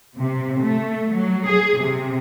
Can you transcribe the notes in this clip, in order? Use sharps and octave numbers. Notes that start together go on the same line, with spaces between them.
C3
A3
F#3
G#4
C3